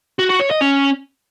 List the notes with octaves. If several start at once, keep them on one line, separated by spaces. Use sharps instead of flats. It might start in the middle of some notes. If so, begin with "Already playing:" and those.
F#4
F#4
C#5
D#5
C#4